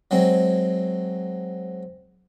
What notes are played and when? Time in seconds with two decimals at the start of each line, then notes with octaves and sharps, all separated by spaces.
0.11 F#3 G#3 C4